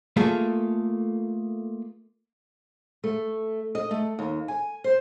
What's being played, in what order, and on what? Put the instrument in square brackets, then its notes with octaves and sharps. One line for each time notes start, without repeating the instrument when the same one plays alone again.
[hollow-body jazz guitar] A3 A#3 F4 G#4 A4
[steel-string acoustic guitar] A3
D#5
A3
D#2
G#5
C5